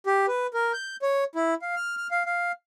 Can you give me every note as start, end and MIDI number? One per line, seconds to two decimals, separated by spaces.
0.06 0.26 67
0.28 0.47 71
0.54 0.72 70
0.73 0.96 91
1.02 1.24 73
1.35 1.54 64
1.62 1.75 77
1.76 1.96 89
1.97 2.07 89
2.11 2.23 77
2.26 2.52 77